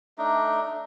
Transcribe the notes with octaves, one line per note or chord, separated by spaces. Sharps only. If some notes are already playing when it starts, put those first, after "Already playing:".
A3 D4 D#4